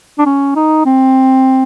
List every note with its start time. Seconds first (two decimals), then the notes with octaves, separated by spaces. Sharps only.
0.18 D4
0.26 C#4
0.56 D#4
0.86 C4